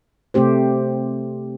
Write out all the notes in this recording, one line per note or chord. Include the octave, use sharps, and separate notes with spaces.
C3 A3 C4 G4 C5